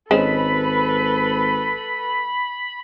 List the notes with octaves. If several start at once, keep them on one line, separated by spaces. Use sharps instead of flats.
G#1 G#3 C#4 A4 B4 C5 B5